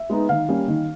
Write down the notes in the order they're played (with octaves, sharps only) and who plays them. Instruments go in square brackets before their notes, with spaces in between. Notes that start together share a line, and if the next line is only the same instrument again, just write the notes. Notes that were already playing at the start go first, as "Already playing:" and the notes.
Already playing: [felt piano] E5
G#3 B3 D#4
D#3 F5
G3 A#3 C#4
D#3